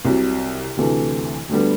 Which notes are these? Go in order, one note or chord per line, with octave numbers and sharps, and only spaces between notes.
C2 C3 F#3
D2 C3 E3 A3
D2 D3 G3 B3